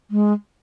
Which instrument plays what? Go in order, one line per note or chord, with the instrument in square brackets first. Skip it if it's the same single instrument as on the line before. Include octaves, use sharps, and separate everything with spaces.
[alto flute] G#3